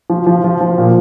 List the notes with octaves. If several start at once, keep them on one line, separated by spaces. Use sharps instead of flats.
F3
F3
F3
F3
A#2